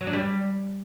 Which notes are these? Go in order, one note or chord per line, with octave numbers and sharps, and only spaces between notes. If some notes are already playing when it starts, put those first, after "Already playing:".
F#3
D4
G3